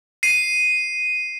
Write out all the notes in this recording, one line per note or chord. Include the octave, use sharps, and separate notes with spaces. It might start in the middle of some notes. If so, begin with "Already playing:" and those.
C7 D#7